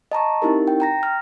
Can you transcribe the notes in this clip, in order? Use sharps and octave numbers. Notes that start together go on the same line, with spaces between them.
D#5 A5 A#5 C#6
C4 D#4 E4 G4 A#4
G5
G5 A#5 A#6
F6